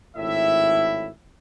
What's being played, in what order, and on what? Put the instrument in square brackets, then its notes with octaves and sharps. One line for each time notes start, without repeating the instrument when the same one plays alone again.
[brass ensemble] G#1 A2 E4 E5